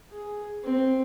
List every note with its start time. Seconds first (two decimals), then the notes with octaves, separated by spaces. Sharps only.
0.11 G#4
0.64 C4